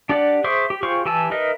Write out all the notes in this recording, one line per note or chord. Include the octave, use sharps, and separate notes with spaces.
D4 G4 D5 F#5 D6
G#4 C5 E5 C#6 D6
G4
F4 G4 G#4 C5 C#6
E3 G4 G#5 A5 E6
D#4 A#4 B4 D#5 E5